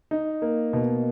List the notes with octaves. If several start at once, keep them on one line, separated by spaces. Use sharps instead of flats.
D#4
A#3
B2